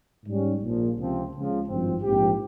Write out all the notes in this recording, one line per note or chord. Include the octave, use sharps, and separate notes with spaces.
G#2 G3 C#4
A#1 A#2 F3
C#2 C3 F3 C4
C#2 C#3 F3
G#1 G2 F3 C4
A#1 G#2 F3 C4 G4